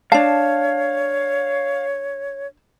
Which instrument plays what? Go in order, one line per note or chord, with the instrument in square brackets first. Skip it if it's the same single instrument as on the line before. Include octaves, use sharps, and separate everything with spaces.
[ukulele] D4 A5 [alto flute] C#5 [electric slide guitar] F5